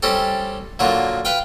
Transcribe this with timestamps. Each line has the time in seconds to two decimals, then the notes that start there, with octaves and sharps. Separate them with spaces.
0.03 G3 C4 C#4 G4 A4
0.79 A#2 D3 F#3 A#3 F4
1.25 B4 F5 G5